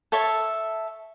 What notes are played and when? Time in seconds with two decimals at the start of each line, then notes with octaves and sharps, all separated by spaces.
0.12 A4 C#5 E5 A5